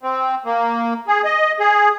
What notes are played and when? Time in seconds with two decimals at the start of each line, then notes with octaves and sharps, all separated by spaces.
0.03 C4
0.45 A#3
1.08 G#4
1.25 D#5
1.59 G#4